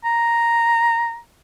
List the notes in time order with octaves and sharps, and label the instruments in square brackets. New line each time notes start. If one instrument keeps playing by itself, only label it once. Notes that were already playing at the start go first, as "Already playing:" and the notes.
[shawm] A#5